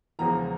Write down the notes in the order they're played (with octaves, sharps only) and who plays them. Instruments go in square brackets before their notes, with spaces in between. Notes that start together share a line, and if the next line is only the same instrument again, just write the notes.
[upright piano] E1 E2 C#3 F3 G#3 A#5